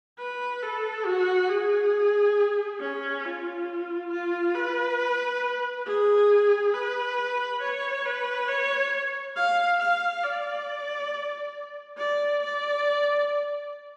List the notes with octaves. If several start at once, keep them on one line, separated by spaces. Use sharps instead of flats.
B4
A4
F#4
G#4
C#4
F4
F4
B4
G#4
B4
C#5
B4
C#5
F5
F5
D5
D5
D5